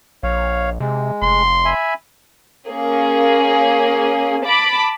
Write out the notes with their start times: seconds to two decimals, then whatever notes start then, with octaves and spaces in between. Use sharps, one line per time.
0.23 A#1 C#5 F5
0.80 C3 G#3
1.22 F1 C6
1.65 E5 G#5 B5
2.69 A#3 C#4 G#4
4.44 A5 B5 D6